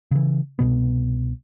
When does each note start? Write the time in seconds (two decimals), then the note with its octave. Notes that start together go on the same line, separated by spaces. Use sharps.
0.11 C#3 E3
0.59 C2 B2 B3